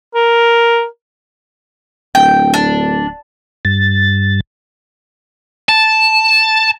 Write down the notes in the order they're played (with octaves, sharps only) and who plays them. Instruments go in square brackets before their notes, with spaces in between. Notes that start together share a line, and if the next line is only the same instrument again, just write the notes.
[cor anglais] A#4
[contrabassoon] D1 [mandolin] G5
[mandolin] D4
[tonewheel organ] G2 A6
[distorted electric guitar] A5